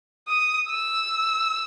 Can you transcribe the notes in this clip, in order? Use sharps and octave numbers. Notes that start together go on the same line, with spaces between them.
D#6
E6